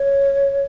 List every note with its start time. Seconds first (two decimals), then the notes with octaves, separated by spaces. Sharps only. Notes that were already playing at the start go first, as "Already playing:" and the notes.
Already playing: C#5